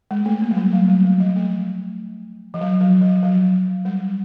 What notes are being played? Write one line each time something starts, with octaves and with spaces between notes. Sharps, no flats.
G#3
A3
A#3
F#3
G3
F#3
F#3
F#3
F3
A3
F3
F#3
F#3
F3
F#3
G3